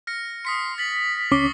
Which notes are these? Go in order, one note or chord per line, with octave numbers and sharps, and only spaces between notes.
F6 A#6 C#7
C6 D#6 B6 C#7
A6 B6 F#7
C#2 C#4 C#6 D6 C7 G7